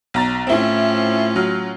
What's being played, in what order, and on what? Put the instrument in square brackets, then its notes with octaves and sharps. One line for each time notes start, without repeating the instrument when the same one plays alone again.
[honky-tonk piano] B1 A#5 A6
[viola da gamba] A2 C#4 F4 [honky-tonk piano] C4 E4
[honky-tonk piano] F#3 F6